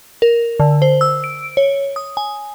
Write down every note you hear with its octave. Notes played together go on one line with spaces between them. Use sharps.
A#4
D3
C5
E6
D7
C#5
D#6
G#5